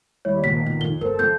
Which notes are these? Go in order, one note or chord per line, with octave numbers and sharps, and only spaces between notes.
D#2 G3 E4 C#5
A#1 A#2 D#3 F4 B6
B1
F2 G7
G1 A4 A#4 C5
F2 F3 G6